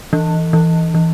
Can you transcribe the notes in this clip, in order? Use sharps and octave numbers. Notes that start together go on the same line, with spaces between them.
E3
E3
E3